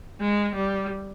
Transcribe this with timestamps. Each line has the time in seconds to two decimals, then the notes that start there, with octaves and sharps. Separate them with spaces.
0.20 G#3
0.55 G3